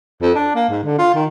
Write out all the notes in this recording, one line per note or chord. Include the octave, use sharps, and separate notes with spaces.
F2
D4
A#3
G#2
D3
F4
D#3